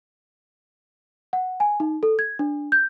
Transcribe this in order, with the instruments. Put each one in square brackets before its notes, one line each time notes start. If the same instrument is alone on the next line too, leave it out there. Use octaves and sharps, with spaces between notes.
[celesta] F#5
G#5
D#4
A4
G#6
D4
G6